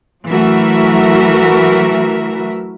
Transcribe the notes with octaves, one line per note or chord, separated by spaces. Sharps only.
E3 F#3 A3 F#4 A#4 E5